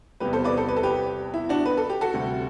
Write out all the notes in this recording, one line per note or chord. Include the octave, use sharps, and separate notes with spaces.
E2 C3 G3 G4 B4
A4 C5
B4 D5
A4 C5
B4
A4
G4 B4
E4
D4 F#4
B4
A4
G4
F#4 A4
D2 C3 G3